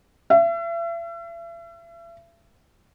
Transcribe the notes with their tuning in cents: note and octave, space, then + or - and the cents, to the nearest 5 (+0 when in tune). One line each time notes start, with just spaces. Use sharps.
E5 +40